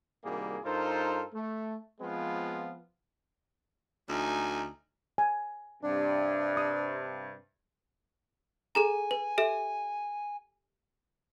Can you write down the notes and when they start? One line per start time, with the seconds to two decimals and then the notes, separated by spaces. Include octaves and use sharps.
0.24 C2 D#3 G3 A#3 F#4 G#4
0.64 G2 D#4 F4 A4 A#4 C5
1.34 A3
2.00 F3 G#3 B3 C4 F4 B4
4.09 D2 D#4 G#5
5.18 G#5
5.83 G2 C3 D4
6.57 D#6
8.75 G#4 A4 G#5 A#5
9.11 B4
9.38 G4 A4 E5